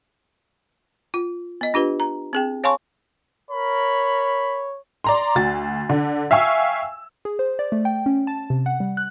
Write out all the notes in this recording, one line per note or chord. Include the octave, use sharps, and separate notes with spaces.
F4
B3 D#5
D4 F4 G4 B4
A#5
C4 G#4 G5
C#5 F5 G#5 A5 C6 C#6
A#4 C#5 B5
D5 A#5 C6
D2 F#4 A6
D3
E5 F5 G5 G#5 C#6 E6
G#4
C5
D5
A3
G5
C#4
A5
C3
F#5
G3
F#6